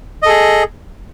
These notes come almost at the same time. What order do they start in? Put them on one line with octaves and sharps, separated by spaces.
D#5 A4 G#4